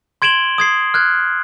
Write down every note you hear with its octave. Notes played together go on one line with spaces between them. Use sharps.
C6 G#6 D7 E7 F#7 G7
D#6 G#6 C7
F6 F#6 G#6